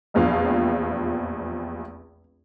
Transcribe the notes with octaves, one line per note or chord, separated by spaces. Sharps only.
F1 A#1 E2 F3 F5